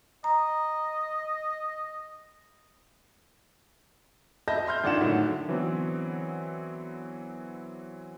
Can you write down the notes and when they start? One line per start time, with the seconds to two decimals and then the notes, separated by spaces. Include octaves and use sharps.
0.24 D#5 A#5
4.48 D#5 E5 A5 B5 G6 A#6
4.66 E5 C6 F6 G6
4.84 G#1 D4 F4 F#5 E7
5.01 A2 D3 D#3 F#3
5.48 D3 E3 F#3 B3 C4